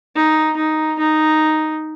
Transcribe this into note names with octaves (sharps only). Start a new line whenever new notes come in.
D#4
D#4
D#4